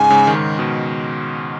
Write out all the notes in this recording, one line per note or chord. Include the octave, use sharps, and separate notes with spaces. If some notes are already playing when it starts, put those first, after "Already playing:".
Already playing: G#2 C#3 G#5
G#2 C#3
D#3
G#2 C#3
B2 D#3